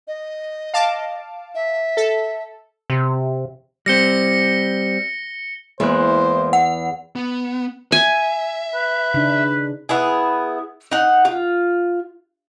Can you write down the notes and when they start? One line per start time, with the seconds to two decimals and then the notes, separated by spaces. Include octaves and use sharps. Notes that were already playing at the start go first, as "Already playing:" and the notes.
0.08 D#5
0.74 F5 A5 D6
1.55 E5
1.97 A4
2.90 C3
3.86 G3 C4 A#6 C#7 G7
5.80 E2 G#3 A#3 E4 C5 F#6
6.53 F#5
7.16 B3
7.92 E5 G#5
8.75 B4
9.14 C#3 D4 D#4
9.89 B3 E4 G#4
10.91 D#4 F#5
11.25 F4